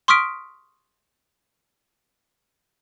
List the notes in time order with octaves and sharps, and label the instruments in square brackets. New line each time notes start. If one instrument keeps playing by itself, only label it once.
[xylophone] C6 C#6 D#6 F6 B6 D7